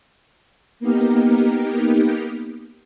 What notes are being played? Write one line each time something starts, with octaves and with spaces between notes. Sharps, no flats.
A#3 B3 D#4 G4 A#4